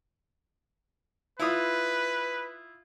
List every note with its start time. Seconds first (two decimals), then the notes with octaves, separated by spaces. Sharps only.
1.40 E4 F4 B4 D#6